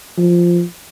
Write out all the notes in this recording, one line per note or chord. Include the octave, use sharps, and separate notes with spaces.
F3